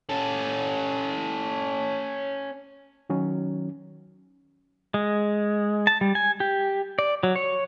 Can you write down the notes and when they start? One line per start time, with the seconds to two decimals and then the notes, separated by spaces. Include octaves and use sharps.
0.09 C#4 A4
3.10 D#3 F#3 C#4
4.94 G#3
5.87 A5
6.01 G3
6.15 G#5
6.40 G4
6.99 D5
7.23 F#3
7.36 C#5